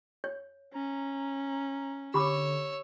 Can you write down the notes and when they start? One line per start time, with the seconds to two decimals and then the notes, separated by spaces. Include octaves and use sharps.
0.24 C#5
0.74 C#4 A#5
2.14 D3 G4 C#5 B5 D6 E6